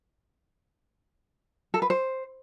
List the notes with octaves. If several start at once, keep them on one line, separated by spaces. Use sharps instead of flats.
A4
B4
C5